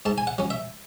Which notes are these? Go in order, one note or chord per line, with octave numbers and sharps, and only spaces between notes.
G#2 A5
G#5
F#5
F#3 C#4
E5